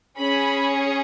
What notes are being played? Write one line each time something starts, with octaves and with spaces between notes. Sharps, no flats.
C#4 G#4 B5